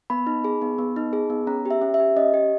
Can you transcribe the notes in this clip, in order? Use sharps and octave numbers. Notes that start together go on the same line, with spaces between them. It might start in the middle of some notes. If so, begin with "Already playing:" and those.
B3 B5
D#4
G#4
B3
B3
D#4
G#4
B3
C#4 A#5
G4
E5
C#4
E5
G4
C#4 D#5
G4